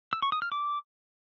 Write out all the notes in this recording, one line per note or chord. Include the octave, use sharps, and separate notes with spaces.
E6
C#6
D#6
F6
D6